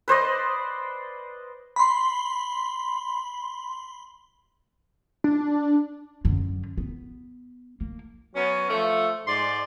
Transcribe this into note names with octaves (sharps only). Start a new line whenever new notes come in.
B4 C5 D5 D#5
B5 C6
D4
F#2 D3
B3
A#3
F#3 B3 C#4
F3 A3
G#2 D5 C6